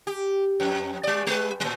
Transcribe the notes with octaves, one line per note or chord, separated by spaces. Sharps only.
G4
F2
G3 D5
G3 B4
A2 F#3